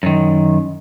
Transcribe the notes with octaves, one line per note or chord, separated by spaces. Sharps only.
F#2 D#3